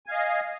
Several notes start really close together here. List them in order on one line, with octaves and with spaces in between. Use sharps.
G#5 F5 D#5